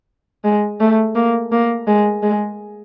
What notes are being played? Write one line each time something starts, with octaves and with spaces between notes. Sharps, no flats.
G#3
A3
A#3
A#3
G#3
G#3